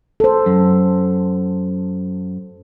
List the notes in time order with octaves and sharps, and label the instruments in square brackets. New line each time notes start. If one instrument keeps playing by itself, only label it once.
[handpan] A4 C5
[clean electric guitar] F#2